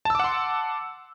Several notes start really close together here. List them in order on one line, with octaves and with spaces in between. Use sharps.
A5 E6 D6 F#5 C6